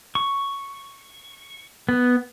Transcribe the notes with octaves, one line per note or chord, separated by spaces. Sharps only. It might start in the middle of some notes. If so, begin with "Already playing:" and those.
C#6
B3